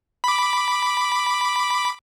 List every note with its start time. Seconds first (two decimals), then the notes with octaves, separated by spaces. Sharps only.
0.24 B5 D6